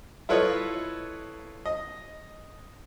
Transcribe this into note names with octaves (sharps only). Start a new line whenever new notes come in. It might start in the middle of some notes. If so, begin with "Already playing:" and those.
E4 F4 A4 B4 C#5 D#5
D#5